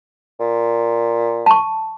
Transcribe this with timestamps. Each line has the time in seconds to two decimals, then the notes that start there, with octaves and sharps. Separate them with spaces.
0.40 A#2
1.46 A5 C#6